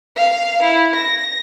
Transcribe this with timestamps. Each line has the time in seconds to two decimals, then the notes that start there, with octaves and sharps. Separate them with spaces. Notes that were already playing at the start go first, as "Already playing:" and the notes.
0.16 F5
0.63 E4
0.95 A#6